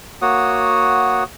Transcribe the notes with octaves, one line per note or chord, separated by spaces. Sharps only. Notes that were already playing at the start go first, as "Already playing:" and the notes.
A#3 F#4 C#5 F#5 D#6